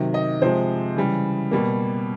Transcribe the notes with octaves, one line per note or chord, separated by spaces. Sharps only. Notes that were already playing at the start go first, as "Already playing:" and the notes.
Already playing: C3 D#3 F#3
D#5
C3 F3 G#3 C5
C#3 E3 G3
B2 G3 A#3